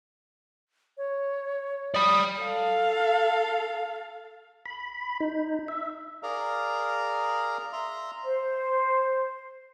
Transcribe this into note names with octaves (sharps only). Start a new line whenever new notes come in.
C#5
D5 B5 D#6
A4 F5
B5
D#4
E5
G#4 A#4 D5 F5 A#5
E5 A#5 C6
C5